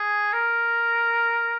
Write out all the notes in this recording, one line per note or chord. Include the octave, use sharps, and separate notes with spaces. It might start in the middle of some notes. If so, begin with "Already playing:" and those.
Already playing: G#4
A#4